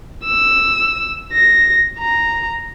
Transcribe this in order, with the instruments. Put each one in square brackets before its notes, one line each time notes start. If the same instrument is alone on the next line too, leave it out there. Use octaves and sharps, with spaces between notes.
[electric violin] E6
A#6
A#5